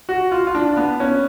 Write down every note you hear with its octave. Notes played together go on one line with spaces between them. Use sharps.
F#4
F4
F4
D4
B3
C#4